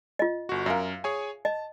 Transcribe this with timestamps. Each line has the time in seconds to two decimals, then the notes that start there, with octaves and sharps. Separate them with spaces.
0.19 F4 D#5
0.49 G1 F#4
0.66 F#2 A#4 E5 F5
1.04 G#4 C#5 G#5
1.45 D#5 A5